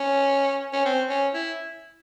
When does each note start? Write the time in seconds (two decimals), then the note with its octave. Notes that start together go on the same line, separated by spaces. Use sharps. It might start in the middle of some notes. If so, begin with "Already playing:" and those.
Already playing: C#4
0.73 C#4
0.85 C4
1.10 C#4
1.34 E4